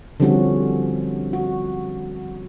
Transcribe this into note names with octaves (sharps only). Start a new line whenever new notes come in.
D3 F3 G3 C4 C#4 F#4
F#4